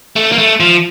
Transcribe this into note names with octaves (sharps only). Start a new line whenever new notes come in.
A3
A#3
A3
F3